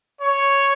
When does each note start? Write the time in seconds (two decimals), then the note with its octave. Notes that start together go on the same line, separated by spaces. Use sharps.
0.21 C#5